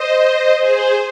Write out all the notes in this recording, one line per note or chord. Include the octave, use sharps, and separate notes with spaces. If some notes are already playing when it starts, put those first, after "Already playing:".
Already playing: C5 D#5
G#4 C5